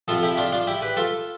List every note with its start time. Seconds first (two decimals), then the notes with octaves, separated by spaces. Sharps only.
0.08 F2 C3 F3 F4 A4
0.23 E4 G4
0.38 D4 F4
0.52 D4 F4
0.67 E4 G4
0.82 G4 B4
0.97 F4 A4